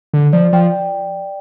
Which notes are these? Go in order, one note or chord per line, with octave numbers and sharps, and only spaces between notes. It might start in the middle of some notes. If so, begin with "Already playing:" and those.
D3
F3 D5
F3 G5